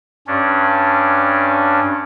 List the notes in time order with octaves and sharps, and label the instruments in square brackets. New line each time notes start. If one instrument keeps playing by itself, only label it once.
[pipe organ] G2 C#4 D4